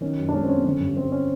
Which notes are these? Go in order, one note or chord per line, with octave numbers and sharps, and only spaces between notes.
D#3 C#4
F#2
D4
G#3 C#4
C4
B3 C#4
D3 C#4
G2
G3 C4
C#4